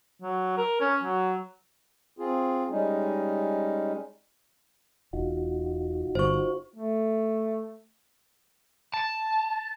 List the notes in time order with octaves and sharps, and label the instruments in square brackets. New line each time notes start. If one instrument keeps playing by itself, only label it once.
[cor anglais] F#3
A#4
C#4
F#3
[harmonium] C4 F4 G#4
G3 G#3 C#4 D#4
[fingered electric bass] E1 [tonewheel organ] D#4 F4 F#4
[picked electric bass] G1 [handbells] C5 C#6
[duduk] A3
[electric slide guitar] A5